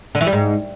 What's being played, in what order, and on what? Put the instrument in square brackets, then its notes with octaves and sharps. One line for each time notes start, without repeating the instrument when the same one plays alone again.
[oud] D3
E3
G3
G#2